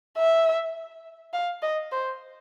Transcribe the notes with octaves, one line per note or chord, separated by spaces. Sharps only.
E5
F5
D#5
C5